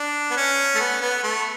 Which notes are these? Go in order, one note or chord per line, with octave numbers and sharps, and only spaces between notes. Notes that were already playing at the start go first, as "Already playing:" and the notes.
Already playing: D4
B3
C#4
A3
B3
B3
A3